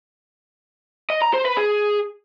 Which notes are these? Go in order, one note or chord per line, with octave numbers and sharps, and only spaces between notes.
D#5
A#5
C5
B4
G#4